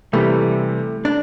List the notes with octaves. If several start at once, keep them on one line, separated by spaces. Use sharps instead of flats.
C3 E3 G3 A3
D4